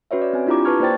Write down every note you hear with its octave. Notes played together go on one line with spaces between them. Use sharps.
C#4 F#4 B4 C#5 E5
D5
C4 G#5
D4 E4 F4 G4 A#5 D6
B4 A5 C#6 F6 G#6
A#3 B4 C5 D5 G5 A6